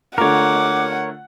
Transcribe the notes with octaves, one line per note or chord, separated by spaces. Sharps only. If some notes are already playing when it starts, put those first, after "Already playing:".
D3 A3 F4 A#4 C#5 F#5 D6